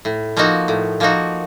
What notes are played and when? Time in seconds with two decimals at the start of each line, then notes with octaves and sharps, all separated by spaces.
0.05 A2
0.37 F3 A#3 D#4 F#4
0.68 A2
1.00 F3 A#3 D#4 F#4